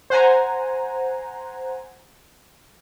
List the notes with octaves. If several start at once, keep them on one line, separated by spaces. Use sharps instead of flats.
C5 F#5 G#5 A#5